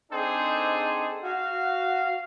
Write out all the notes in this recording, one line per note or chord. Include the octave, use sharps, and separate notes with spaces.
C4 D4 D#4 G#4 A4 C5
F#4 F5